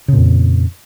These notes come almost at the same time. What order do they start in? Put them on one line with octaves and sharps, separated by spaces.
C#3 A#2 F2